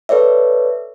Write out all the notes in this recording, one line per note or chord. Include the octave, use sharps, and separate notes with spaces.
A4 B4 C#5 D5 E5